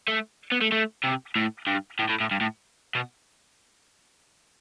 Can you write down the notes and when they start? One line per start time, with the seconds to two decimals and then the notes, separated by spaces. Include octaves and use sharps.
0.08 A3
0.52 B3
0.61 A3
0.72 A3
1.04 C3
1.36 A2
1.67 G2
1.99 A2
2.09 A2
2.20 A2
2.31 G2
2.41 A2
2.95 B2